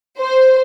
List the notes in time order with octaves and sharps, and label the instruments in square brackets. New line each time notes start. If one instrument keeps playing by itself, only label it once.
[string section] C5